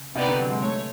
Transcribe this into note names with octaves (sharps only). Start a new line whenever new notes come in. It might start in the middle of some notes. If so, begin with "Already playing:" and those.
Already playing: C#3
C3 B3 D#4 G4 B4 D5
D3
F#3
G#3
A3 C#5